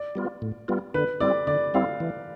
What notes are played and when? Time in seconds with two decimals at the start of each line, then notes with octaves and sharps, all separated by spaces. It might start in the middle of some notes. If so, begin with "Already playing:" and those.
Already playing: D5
0.15 G3 B3 F4
0.42 A2
0.68 G3 B3 F4
0.94 D3 B4
1.20 G3 C4 E4 D5
1.47 D3 D5
1.74 G3 C4 E4 F5
2.00 E3